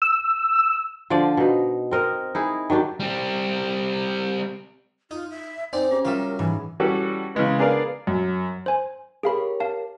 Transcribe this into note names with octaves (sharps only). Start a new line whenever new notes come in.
E6
D3 F3 C5 D5
B2 D#4
C4 A#4 D#5
D#4 E4 G#4
D#3 F#3 D4 G4
G3 C4
D#4 F4 D#6
E5
C4 D#4 C5 D5 G#5
C#4 C#5 D6
F#3 G3 F4 A#4 E5
G#2 E3 G#5
E3 G3 C#4 F#4 G4 A4
C#3 E3 G#3 B3
B3 D4 G#4 A#4 D5 F5
F#2
C5 G#5
G4 G#4 A#4 C#5 F5 B5
F5 A5